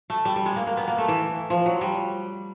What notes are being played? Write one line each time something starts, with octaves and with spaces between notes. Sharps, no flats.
A3
G3
G3
G#3
A#3
A#3
B3
A#3
A3
E3
F3
F#3
G3